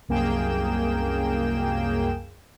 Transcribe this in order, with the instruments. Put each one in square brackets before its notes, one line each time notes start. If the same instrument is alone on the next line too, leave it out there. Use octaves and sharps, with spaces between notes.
[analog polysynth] C2 F#2 A#3 G#4 G5 E7